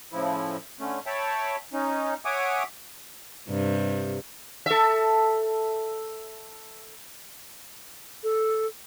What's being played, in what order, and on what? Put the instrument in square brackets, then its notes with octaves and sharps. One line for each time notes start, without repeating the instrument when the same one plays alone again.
[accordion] A2 C#3 F3 E4
D3 A3 C#4
C#5 E5 G5 A5 B5
C#4 D#4
C#5 E5 F#5 G#5 D6 D#6
[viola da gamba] G2 C3
[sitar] A4 E5
[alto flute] A4